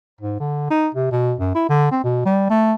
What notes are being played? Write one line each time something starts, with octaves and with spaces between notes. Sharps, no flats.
G#2
D3
D#4
C3
B2
F#2
E4
D3
C4
B2
G3
A3